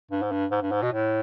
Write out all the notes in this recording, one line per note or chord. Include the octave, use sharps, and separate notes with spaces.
G2
G#2
G2
G#2
G2
G#2
B2
A2